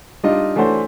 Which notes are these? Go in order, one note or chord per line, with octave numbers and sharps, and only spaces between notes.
G3 D4 D#4 F4 D#5
E3 A3 D4 F#4 C5 C#5